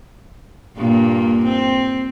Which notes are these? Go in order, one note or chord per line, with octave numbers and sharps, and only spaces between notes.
G2 A#2 A#3
C4